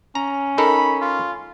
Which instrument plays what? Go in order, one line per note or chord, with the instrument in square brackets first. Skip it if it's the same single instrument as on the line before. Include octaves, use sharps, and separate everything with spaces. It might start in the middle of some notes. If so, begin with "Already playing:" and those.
[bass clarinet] C#4 [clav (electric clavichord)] A#5
[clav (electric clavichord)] D#4 A4 A#4 [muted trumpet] B5
[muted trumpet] F4